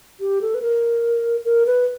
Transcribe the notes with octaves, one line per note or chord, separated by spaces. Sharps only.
G4
A4
B4
A#4
A#4
B4